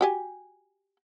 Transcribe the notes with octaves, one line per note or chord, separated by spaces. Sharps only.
F#4 G4 G#5